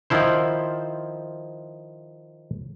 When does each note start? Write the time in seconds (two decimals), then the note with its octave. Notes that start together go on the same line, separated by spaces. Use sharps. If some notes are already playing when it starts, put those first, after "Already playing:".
0.10 D#3 F3 E4 C5